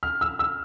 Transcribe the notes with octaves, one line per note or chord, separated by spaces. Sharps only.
F6
E6
E6